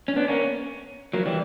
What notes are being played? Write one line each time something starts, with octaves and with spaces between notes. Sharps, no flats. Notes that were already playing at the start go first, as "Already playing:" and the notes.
C#4
B3 D4
A#3 C#4
F#3 A#3
E3 G3